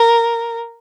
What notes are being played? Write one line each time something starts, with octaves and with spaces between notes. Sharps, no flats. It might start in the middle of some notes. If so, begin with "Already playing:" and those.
Already playing: A#4